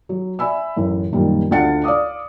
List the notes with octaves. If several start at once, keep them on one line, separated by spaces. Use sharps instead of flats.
F#3
D5 E5 G#5 B5 E6
A1 F#2
F#2 A#2 D#3 F3 G3
D2 F4 D5 F#5 A6 C#7
D5 F5 D6 D#6